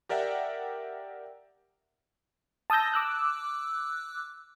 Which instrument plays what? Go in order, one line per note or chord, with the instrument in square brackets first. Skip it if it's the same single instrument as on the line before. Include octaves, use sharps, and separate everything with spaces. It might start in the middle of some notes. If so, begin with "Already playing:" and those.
[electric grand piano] G4 A#4 D5 E5 F#5 G5
[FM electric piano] A5 D#6 E6 G6 A#6
D6 E6 F#6